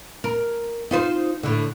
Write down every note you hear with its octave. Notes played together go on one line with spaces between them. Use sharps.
A#4
D#4 F4 C5
A2 D3